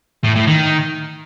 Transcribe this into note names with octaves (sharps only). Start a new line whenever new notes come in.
A2
A2
D#3